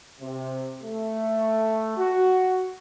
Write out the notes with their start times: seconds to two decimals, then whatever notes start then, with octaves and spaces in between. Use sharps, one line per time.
0.21 C3
0.83 A3
1.98 F#4